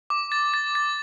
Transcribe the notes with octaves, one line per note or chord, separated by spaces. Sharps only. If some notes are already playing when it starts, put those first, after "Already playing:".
D6
A6
A6
A6